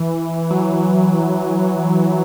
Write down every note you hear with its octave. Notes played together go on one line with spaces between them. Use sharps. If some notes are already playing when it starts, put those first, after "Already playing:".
Already playing: E3
E3
F#3
E3